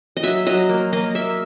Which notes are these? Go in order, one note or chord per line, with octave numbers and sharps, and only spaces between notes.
D#5
F#3 E5
F#3 D#5
A#3
A#3 D#5
A#3 E5